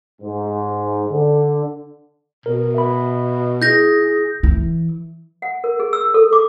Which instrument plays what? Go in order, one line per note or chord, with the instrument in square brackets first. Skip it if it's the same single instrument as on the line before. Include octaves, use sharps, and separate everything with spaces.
[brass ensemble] G#2
D3
[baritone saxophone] B2 [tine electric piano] A#4
[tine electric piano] E5 B5
[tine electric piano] E4 [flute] G#4 [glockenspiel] G6 A#6
[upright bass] E3
[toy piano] F#5
A#4
G#4
E6
A4
D6